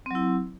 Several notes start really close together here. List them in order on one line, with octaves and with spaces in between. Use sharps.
C4 F#3 E4